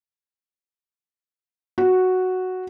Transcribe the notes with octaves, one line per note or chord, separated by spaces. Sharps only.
F#4